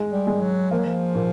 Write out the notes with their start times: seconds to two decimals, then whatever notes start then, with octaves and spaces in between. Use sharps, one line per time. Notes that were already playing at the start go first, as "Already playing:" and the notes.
Already playing: G#3
0.13 G3
0.27 G#3
0.41 F#3
0.71 F3 A#3
0.78 F#3
0.86 F3
1.15 A#2